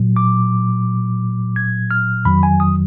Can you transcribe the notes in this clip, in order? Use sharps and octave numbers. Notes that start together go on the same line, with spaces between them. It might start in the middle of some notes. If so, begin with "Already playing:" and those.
Already playing: A#2 F#3
D6
G#6
F6
F2 D#3 F#3 B5
G#5
D#6